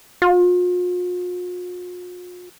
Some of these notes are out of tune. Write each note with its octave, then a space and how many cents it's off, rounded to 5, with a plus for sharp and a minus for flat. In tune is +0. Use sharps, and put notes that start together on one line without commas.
F4 +45